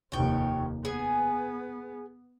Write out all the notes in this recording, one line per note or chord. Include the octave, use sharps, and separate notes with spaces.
F1 D#2 C#5 G5
B3 G#4 G#5